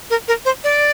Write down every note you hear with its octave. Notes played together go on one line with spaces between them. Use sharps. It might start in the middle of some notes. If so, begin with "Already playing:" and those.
A#4
A#4
C5
D5